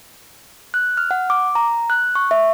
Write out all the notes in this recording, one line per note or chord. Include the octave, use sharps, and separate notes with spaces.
F#6
F6
F#5
D6
A#5
F#6
C#6
E5